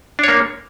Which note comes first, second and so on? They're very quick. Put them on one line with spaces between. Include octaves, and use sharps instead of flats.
D4 C#5 A#3